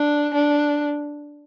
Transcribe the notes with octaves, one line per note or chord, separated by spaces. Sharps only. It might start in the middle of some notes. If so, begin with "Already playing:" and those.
Already playing: D4
D4